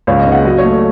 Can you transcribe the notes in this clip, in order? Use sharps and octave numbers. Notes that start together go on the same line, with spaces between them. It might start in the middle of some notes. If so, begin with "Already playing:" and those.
C#2 C#5
D#5
C#3
F#5
F#3 D#5
C#5
A3